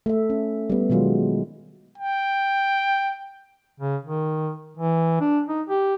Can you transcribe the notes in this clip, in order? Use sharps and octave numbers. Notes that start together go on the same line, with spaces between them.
A3 E5
C#4
G3 B3
B2 D#3 F#3 G#3 F4
G5
C#3
D#3
E3
D4
D#4
G4